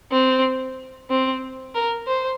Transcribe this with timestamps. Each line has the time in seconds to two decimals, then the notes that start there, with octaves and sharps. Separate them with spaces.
0.11 C4
1.10 C4
1.75 A#4
2.07 C5